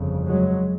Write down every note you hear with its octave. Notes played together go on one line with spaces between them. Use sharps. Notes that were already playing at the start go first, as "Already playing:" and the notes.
Already playing: G1 F2 C#3
F#3 G#3